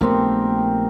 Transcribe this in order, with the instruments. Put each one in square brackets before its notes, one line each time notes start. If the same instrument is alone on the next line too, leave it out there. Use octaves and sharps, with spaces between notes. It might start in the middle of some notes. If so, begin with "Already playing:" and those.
[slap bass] A#1 A3 B3 [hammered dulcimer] C4 G4 A#4